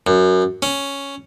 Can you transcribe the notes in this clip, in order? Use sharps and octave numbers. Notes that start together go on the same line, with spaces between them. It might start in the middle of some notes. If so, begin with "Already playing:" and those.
F#2
C#4